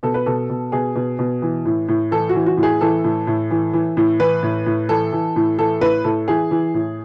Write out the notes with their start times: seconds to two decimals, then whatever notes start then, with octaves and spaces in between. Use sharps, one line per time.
0.03 B2 A4
0.14 B4
0.26 B2 A4
0.49 B2
0.72 B2 G#4
0.95 B2
1.19 B2
1.42 E3
1.65 A2
1.88 A2
2.11 E3 A4
2.29 F#4
2.35 E3
2.46 F#4
2.57 A2
2.63 G#4
2.81 E3 A4
3.04 A2
3.27 A2
3.51 E3
3.73 E3
3.97 A2
4.20 E3 B4
4.43 A2
4.66 A2
4.89 E3 A4
5.12 E3
5.36 A2
5.58 E3 A4
5.81 A2 B4
6.04 A2 A4
6.28 E3 G#4
6.51 E3
6.74 A2